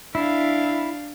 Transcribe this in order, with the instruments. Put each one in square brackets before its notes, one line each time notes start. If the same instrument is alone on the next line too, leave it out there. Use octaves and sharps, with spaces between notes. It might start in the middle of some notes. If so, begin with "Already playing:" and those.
[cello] D4 F5 [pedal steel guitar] E4